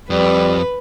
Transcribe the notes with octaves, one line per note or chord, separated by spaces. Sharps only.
F2 G3 B4